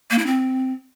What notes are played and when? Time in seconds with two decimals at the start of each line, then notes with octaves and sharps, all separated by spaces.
0.11 A#3
0.18 E4
0.26 C4